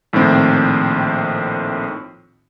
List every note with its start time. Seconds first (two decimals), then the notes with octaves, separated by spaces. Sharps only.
0.13 A#1 A2 D#3 C4